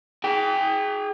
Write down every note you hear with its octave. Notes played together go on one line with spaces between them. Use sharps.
G#4 G5